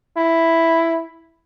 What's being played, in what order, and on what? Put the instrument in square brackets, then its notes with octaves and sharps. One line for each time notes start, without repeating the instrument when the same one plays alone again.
[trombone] E4